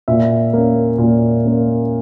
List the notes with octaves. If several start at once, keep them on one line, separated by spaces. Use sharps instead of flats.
A#2 E5
A#3 C#4
A#2
A#3 C#4